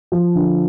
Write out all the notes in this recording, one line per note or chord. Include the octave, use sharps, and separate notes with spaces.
F3
D3